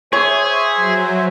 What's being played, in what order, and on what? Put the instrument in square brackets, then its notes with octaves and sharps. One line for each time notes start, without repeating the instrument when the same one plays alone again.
[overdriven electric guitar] G#4 [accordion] C5 E5 G#5 [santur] C#5
[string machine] F#3